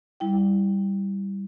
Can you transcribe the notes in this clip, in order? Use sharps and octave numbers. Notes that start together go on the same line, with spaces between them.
G3 E4 G5